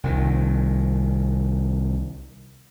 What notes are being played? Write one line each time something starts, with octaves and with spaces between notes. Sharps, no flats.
C2 D#3